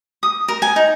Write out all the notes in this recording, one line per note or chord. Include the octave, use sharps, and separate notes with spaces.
D#6
A#4
G#5
D#4